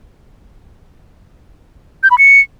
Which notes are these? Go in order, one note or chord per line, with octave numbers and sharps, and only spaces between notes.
G6
B5
C#7